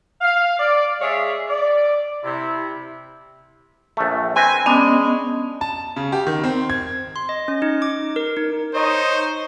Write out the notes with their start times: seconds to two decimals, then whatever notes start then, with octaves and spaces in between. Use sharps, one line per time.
0.21 F5
0.59 D5
1.01 G#3 G#4 C#5 D5 E5 F5
1.50 D5
2.24 C3 E4
3.97 A#1 A3
4.36 C4 B4 G#5
4.66 G#3 B3 C#4 D4 D#5
5.61 A5
5.96 C#3
6.12 G4
6.27 D#3
6.44 C4
6.70 G#6
7.16 C6
7.29 D#5
7.48 C#4
7.62 D#4
7.82 D6
8.16 A#4
8.37 D#4
8.75 D#4 C5 C#5 D#5